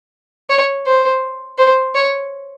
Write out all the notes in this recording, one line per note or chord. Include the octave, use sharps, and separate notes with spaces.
C#5
C5
C5
C#5